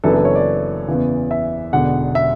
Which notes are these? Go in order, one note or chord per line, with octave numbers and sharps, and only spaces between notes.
F#1 F#2 E3 B3 D4 A4
A4
C#5
D5
E2 C#3 E3
E5
E1 E2 D3 F#5
E5